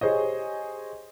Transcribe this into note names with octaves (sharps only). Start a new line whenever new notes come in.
G4 G#4 C5 C#5 D#5